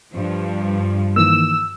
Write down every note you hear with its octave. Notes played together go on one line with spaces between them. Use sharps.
G2 F3
D#3 E3 A#3 E6